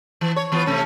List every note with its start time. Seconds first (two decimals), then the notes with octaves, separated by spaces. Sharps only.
0.21 E3
0.36 C#5
0.52 E3 B3 F4
0.66 C3 A3 C#4